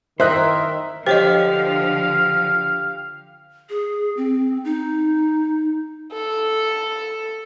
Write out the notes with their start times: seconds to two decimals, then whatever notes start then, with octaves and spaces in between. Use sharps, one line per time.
0.20 D#3 E4 A#4 C5 D#5 E5 F#6
1.07 D3 F3 G4 C5 C#5 D#5 F5
3.70 G#4
4.17 C4
4.65 D#4
6.13 A4